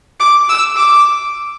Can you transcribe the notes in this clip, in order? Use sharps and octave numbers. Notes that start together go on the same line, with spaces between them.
D6
E6
D6